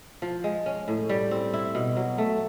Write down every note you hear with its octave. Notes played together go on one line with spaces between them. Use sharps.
F3
G#3
C#4
A2
G3
C4
E4
B2
F#3
A3